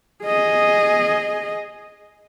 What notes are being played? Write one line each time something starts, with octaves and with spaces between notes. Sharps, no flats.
G#4 D#5